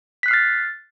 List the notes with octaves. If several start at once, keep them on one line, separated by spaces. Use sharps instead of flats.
F6 F#6 A6 B6 C7